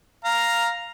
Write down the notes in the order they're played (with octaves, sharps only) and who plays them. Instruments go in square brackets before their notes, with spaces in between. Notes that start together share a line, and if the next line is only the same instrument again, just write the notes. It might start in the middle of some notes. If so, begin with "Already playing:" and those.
[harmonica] F5 A#5